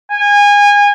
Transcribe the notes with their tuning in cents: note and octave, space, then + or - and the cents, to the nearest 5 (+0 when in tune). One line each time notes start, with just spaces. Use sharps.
G#5 -25